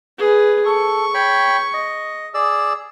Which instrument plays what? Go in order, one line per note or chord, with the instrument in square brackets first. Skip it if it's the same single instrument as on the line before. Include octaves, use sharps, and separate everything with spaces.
[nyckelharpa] G#4 B4
[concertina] A4 [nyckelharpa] C#6
[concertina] C#5 G5 B5
D#5
G#4 D5 E6